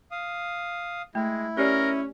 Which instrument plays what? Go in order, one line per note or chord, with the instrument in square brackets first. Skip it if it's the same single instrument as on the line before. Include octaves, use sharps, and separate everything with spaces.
[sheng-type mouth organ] F5 D#6
[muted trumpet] G#3 [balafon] A3 [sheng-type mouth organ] E4
[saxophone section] C#4 [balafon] G4 D5 [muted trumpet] A#4